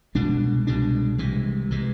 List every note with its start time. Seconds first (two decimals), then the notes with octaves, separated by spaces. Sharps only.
0.15 C2 B2 G#3 D4
0.67 C2 B2 G#3 D4
1.18 C2 C3 E3 G#3
1.71 C3 E3 G#3